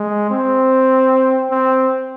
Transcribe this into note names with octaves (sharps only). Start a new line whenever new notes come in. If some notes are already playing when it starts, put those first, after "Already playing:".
Already playing: G#3
C4
C4